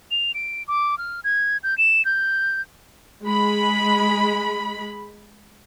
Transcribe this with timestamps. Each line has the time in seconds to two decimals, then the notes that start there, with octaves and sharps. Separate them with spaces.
0.11 F7
0.34 D7
0.68 D6
0.98 F6
1.24 G#6
1.63 G6
1.78 E7
2.05 G6
3.23 G#3 B5